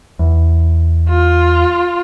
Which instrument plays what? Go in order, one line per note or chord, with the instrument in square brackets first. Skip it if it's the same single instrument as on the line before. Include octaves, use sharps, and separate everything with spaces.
[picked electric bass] E2
[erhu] F4